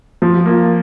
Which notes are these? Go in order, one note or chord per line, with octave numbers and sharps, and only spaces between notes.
F3
A#3 F4